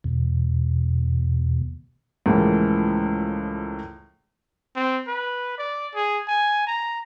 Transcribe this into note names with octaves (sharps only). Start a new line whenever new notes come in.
E2 B2
C#2 A2 E3 F3 A#3
C4
B4
D5
G#4
G#5
A#5